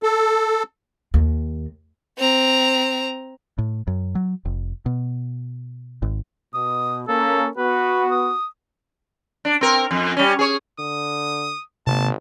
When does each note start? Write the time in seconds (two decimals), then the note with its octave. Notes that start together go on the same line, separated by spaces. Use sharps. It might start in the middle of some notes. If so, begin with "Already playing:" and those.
0.03 A4
1.14 D#2
2.18 C4 A#5
3.58 A2
3.87 F#2
4.15 F#3
4.45 F1
4.86 B2
6.02 G#1
6.54 B2 D#6
7.08 A#3 C#4 A4
7.57 B3 F#4 B4
8.11 D#6
9.45 D4
9.61 C4 A#4
9.91 F2
10.17 G3 C#4
10.39 G#4 C#5
10.79 D3 D#6
11.87 G#1 C3 A#3 A5